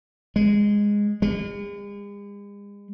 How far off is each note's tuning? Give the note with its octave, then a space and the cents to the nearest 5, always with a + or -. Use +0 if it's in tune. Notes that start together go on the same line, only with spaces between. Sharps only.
G#3 -10
G#3 -45